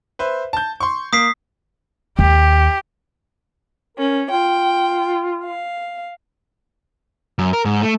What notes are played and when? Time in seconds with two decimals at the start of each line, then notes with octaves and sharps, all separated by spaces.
0.19 B4 C5 E5
0.53 A5 G6
0.80 C6 C#6
1.13 A#3 D#6 B6 C7
2.19 D#2 G4
3.97 C#4 A#4
4.31 F4 G5
5.44 F5
7.39 F#2
7.53 A#4
7.65 G#2
7.82 A3